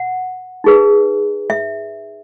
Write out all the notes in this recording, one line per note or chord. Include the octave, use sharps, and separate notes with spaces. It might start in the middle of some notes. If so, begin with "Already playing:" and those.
Already playing: F#5
D#4 G#4 B4
E5